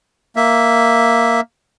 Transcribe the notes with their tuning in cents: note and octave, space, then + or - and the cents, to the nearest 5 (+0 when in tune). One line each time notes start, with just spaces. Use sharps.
A#3 +0 E5 +0